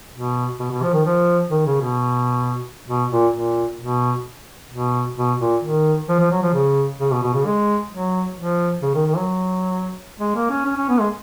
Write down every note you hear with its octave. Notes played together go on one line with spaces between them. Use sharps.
B2
B2
B2
F3
D#3
F3
D#3
C#3
B2
B2
A#2
A#2
B2
B2
B2
A#2
D#3
F3
F3
F#3
F3
C#3
C#3
B2
B2
C#3
G#3
F#3
F3
C#3
D#3
D#3
F#3
G#3
A#3
C#4
C#4
C#4
B3
G#3